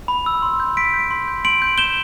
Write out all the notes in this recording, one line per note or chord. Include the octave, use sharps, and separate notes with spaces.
B5
E6
C6
G6
C6 B6 D7
G6
C6
G6
C6 D7 F#7
G6
G6 E7 G7